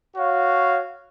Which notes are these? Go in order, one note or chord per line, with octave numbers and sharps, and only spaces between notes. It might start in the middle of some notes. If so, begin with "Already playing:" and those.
F#4 C#5 F5